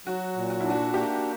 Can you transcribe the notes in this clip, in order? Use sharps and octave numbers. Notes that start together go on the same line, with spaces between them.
F#3 F#4
A#2
F#4
D4 E4
F#4
A#3 G4